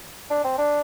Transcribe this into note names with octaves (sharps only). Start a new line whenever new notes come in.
D4
C4
D4